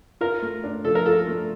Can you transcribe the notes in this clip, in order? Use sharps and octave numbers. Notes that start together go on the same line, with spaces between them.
F4 A#4
A3
D4
F3 A4
A#4
F4 A4
A3